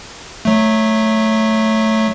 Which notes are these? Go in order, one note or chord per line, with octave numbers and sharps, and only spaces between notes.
F#3 A3